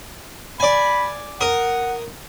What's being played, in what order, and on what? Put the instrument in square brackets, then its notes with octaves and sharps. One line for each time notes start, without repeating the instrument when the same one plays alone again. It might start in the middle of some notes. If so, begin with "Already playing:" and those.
[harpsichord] D5 G#5 [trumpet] B5
[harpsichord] A#4 D#6 [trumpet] F#5